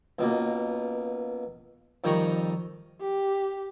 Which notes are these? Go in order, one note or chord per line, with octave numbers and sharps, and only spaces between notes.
C#2 B2 A#3
F2 D#3 G3 G5 A#5 C#6
G4